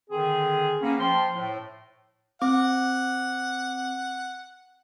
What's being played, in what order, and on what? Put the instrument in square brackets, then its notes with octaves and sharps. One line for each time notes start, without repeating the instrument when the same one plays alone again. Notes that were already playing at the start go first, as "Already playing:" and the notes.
[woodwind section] D3 D#3 C4 G#4
A#3 B3 C#4
F3 G5 C6
A2
[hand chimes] C4 D6 [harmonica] F#5